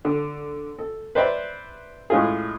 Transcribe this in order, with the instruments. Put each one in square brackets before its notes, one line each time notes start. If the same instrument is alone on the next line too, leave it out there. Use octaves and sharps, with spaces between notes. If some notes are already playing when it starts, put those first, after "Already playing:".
[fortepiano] D3
A4
B4 C5 D5 E5
A2 G#3 C#4 F4 G#4